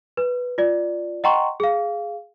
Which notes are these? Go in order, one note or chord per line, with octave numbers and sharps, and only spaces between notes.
B4
F4 D5
D#5 F#5 G5 A#5 C6 C#6
G#4 F5